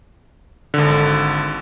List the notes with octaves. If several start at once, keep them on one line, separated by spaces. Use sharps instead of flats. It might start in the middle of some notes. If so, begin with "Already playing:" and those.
G#1 D3